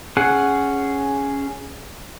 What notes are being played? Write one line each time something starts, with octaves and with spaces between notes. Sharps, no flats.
C#4 G#4 F#5